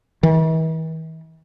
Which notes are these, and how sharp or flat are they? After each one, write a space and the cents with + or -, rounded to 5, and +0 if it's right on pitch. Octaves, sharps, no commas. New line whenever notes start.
E3 -45